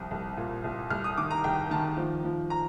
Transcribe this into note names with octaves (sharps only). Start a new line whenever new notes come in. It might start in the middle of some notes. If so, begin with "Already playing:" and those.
Already playing: C2 F2
C2
A#2
C2
C2 F6
D#6
D#3 D6
A#5
C2 G5
D#3 A5
F3
F3
A#5